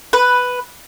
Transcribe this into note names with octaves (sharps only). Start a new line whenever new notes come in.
B4